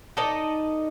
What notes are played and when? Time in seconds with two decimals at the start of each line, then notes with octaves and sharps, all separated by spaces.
0.17 D#4 A4 D5 D#5